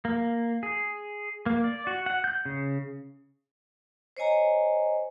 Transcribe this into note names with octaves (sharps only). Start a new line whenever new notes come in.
A#3
G#4
A#3
D5
F#4
F#5
G6
C#3
C5 C#5 D#5 G#5 A#5